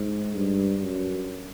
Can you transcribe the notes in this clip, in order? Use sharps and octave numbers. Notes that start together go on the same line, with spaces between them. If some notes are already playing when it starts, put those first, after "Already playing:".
Already playing: G#2
G2
F#2